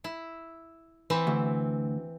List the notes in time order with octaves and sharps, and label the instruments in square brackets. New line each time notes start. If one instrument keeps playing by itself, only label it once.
[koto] E4
E3 C4 E4
[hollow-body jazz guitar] D2